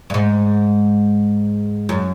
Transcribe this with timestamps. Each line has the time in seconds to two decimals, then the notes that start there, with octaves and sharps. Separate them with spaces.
0.10 G2
0.14 G#2
1.89 F#2